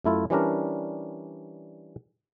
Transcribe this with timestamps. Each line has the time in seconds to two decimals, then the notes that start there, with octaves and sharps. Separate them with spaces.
0.04 F#2 A3 E4 F4
0.30 E3 G3 C#4 D4 A#4